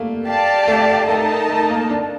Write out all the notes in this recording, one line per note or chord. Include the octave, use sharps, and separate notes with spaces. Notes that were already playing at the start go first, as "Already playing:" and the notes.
Already playing: G3 A3 A#3
G4 D5 F5 A5
A3
A3 D#4 A#4 D#5 A5
A3
A#3
D4